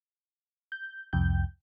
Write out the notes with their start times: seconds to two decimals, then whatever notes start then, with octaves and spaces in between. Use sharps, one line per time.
0.72 G6
1.13 C2 F2 G5 G6